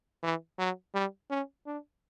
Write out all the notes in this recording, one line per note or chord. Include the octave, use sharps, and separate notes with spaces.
E3
F#3
G3
C#4
D4